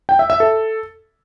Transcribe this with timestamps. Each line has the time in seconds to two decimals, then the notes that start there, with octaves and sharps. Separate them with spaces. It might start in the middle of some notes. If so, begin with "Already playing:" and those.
0.09 G5
0.19 E5
0.30 E5
0.40 A4